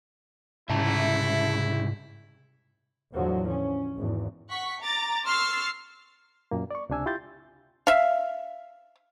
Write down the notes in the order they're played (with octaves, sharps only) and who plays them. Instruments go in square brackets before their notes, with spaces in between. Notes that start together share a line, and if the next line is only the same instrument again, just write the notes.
[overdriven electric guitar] C2 C#3 [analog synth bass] G#2 [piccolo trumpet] E4 [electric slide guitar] E5 A5 A#5
[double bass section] E2 A2 D3 F3 F#3
C#4
G#1 E2
[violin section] F#5 C#6 B6
A#5 D6 A6
C6 C#6 E6 F6 A6 C7
[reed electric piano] F#2 A#2 A#3
D5 C#6
C#2 C3 D4 G#5 E6
E4 F4 G4 C6 G6 A6
[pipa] E5 F5